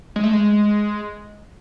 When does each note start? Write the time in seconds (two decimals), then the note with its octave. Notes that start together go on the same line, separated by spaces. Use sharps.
0.16 G#3
0.24 A3
0.33 G#3